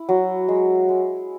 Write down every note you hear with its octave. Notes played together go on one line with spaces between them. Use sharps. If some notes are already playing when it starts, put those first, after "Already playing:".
Already playing: E4
F#3
G#3
G#3